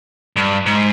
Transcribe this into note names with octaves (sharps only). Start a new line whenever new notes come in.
G2
G#2